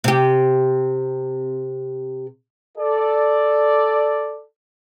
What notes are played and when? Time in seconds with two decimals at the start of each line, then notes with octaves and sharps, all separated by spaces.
0.04 C3 G4
2.78 A4 D5